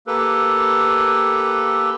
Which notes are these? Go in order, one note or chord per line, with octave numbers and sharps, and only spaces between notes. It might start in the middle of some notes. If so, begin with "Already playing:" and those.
A#3 G4 A4 B4